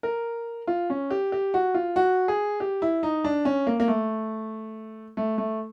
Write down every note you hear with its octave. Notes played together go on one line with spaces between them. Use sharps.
A#4
F4
C#4
G4
G4
F#4
F4
F#4
G#4
G4
E4
D#4
D4
C#4
A#3
A#3
A3
A3
A3